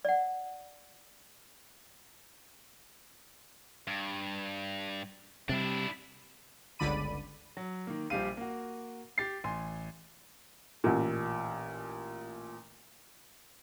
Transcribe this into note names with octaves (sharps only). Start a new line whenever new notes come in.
D5 F#5
G2
C3 G3 D4 E4
G1 C#2 D3 D5 B5 D#7
F#3
D#3 A#3
A#1 F3 G3 G4 F5 D#7
A#3 F#4
G4 A6 C7
A1 G#5 C6
A1 A#2